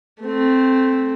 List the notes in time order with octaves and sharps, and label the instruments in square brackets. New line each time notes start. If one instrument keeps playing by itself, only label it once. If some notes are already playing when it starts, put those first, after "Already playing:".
[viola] A3 C4